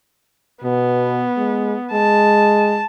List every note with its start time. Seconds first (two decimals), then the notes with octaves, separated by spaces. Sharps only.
0.64 B2 B3
1.37 G#3
1.93 G#3 A5